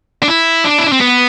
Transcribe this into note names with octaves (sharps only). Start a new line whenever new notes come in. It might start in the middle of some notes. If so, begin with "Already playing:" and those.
D4
E4
D4
E4
D4
C4
B3